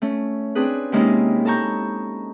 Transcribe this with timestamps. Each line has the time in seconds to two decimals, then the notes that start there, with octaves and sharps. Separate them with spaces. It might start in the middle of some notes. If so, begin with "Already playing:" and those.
0.02 A3 C#4
0.55 C4 D4 G#4 B4
0.92 C3 G#3 A#3 C#4 D#4 E4
1.45 A4 A5 A#5 C#6 G6